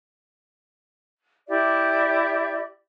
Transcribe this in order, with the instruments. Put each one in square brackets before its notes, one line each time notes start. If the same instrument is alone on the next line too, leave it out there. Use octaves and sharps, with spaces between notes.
[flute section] E4 G4 D5 E5